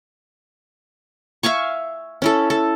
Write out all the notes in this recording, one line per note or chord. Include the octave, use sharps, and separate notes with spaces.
E5 F5 G#5 C#6
C#4 E4 A4
A4